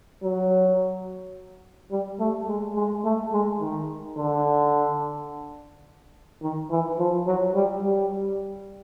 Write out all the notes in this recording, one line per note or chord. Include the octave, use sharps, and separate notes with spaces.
F#3
G3
A3
G#3
G#3
A3
G#3
D#3
D3
D#3
E3
F3
F#3
G3
G3